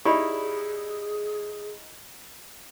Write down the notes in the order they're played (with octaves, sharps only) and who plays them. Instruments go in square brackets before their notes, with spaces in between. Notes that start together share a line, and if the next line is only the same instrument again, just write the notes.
[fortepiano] D#4 E4 [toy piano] G4 D5 B5 [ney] G#4